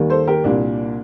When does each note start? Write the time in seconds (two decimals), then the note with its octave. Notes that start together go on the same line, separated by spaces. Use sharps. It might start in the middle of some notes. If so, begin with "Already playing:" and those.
Already playing: D#2 D#3 G3 A#3
0.10 A4 C5
0.27 G4 A#4
0.44 C2 A#2 G3 A#3 D4